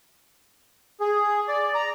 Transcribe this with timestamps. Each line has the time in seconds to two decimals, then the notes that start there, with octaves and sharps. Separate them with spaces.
1.00 G#4
1.48 D5
1.75 A#5